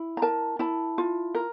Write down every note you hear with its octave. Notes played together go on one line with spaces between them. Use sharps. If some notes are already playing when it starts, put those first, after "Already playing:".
Already playing: E4
A#5
A#4 A5
E4 A5
F4
A#4